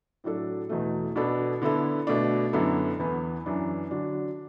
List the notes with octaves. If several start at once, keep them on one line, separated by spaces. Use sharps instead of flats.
A2 F#3 D4 A4
E2 B2 A3
B2 B3 D4 A4
D3 B3 E4 A4
B2 A3 D4
F#2 D3 B3 E4 A4
E2 E3 B3
F#2 E3 D4
D3 F#3 D4